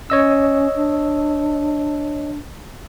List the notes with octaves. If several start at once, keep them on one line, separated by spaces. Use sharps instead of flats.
C#4 C#5 D#5 E6
D4